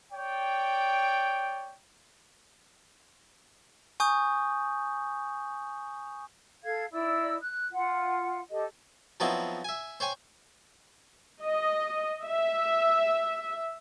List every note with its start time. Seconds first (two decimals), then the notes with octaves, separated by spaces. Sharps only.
0.13 C#5 D5 G5
4.00 G#5 C#6 D#6 G6
6.63 A4 F5 G#6
6.92 D#4 E4 D5 E6
7.41 F#6
7.71 F4 F#5
8.51 G4 A4 D#5
9.20 F3 F#3 B3 C4 D#4 E4
9.65 E5 G#5
10.00 C5 C#5 G5 G#5
11.43 D#5
12.23 E5